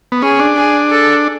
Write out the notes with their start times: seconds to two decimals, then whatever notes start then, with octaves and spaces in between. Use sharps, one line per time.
0.12 B3
0.22 C#4 G#4
0.39 D4
0.56 G#4
0.90 A4